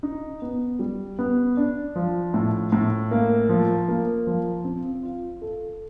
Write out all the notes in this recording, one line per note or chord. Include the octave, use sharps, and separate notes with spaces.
D#4
B3
G3
B3
D4
F3
A2
A2
A#3
F3
A#3
F3
C4
F4
A4